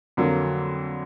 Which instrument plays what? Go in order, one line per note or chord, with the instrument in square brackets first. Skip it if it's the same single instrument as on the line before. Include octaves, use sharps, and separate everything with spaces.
[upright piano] F2 D3 F#3 A#3